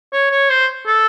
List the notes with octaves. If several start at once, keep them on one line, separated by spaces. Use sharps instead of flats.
C#5
C#5
C5
A4